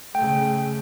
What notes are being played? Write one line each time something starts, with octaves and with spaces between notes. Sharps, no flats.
C#3 A3 G5